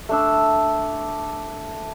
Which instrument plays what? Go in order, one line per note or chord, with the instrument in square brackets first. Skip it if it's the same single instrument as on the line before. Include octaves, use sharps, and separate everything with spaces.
[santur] A3 D4 E6